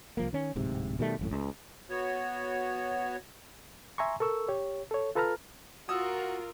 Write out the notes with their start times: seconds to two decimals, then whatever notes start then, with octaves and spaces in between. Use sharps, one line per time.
0.17 C2 F3 A#3
0.33 D#3 C#4
0.56 D1 G#2 C3
0.99 B2 D#3 G3 A3
1.19 G#1 F#2 A2
1.31 C#2
1.90 B3 F#4 C#5
3.98 E5 G#5 A#5 C6 C#6
4.20 A4 A#4 C#6 E6
4.48 G4 C#5
4.91 A4 C#5
5.15 F4 A4 B4 A5 A#5 F6
5.89 F4 F#4 A#4 D#6 E6